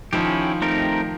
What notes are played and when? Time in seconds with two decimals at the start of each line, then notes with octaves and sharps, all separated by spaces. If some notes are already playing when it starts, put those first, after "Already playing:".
0.13 D#3 F3 C#4 E4 G4
0.62 A3 C4 D#4 G4 A#4